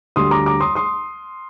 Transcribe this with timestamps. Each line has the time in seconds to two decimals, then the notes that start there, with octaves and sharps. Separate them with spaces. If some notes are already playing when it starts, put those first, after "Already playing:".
0.16 D2 D3 G3 C6 D#6
0.31 A#5 D6
0.46 A#5 D6
0.60 C6 D#6
0.75 C6 D#6